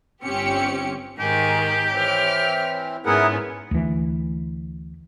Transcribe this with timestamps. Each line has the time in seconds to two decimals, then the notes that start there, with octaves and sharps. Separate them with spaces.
0.23 G1 C4 C#4 G4 C#7
1.19 G#2 D#3 G4 G#4
1.93 E3 C4 C#5 F6
3.06 G#2 B3 C#4 E4 G#4 A#4 F#5
3.71 D2 E3